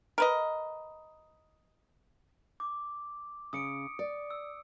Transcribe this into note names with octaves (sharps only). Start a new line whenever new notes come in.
A#4 B4 D#5
D6
C#3 C#4 D#6 C#7 D7
D5
E6